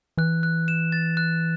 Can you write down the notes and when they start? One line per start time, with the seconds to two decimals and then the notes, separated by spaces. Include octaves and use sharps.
0.18 E3 F#6
0.43 F#6
0.68 E7
0.92 A6
1.17 F#6